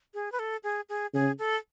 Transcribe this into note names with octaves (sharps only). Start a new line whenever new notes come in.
G#4
B4
A4
G#4
G#4
C#3 G#4
A4